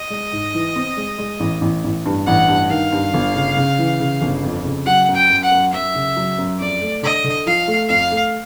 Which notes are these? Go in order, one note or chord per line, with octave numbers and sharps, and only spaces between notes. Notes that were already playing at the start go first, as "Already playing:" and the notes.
Already playing: D#5
G#3
G#2
E3
C4
G#3
G#3
A1
A1
A1
G2
A1 F#5
G2
D#3 F5
G2
G1
C#3
C#3
E3
C#3
G1
F2
C#3
F#3 F#5
F#2
G5
F#2
F#5
F#2
F#2 E5
C#3
F#3
F#2
F2 D5
A3
D3 D#5
D3
F3 F5
A3
F2 F5
A3